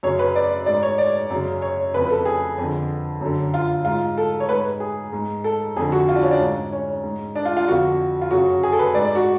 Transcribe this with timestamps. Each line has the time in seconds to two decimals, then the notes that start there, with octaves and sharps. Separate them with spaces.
0.03 F#2 C#3 C#5
0.19 B4
0.36 D5
0.66 G#2 D5
0.83 C#5
0.98 D5
1.30 F#2 C#3
1.62 C#5
1.94 F2 C#3 B4
2.05 B4
2.10 A4
2.25 G#4
2.58 F2 D3
3.21 F#2 D3
3.54 F4
3.85 G#2 F4
4.18 A4
4.40 C#5
4.48 G#2 B4
4.80 G#4
5.12 G#2
5.44 A4
5.76 F2 D3 G#4
5.92 F#4
6.09 F4
6.16 D4
6.23 C#4
6.31 D4
6.40 G#2
6.72 C#4
7.03 G#2
7.35 D4
7.45 F4
7.57 F4
7.67 F2 D3 F#4
8.22 F4
8.31 F#2 C#3 F#4
8.63 G#4
8.72 A4
8.79 B4
8.94 G#2 D5
9.05 D5
9.15 F#4